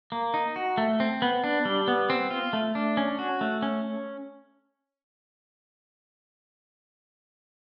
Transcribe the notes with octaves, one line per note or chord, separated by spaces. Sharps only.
A#3
D#4
F#4
A3
C4
B3
D4
G3
B3
C4
F4
A3
D4
C#4
F#4
A3
C#4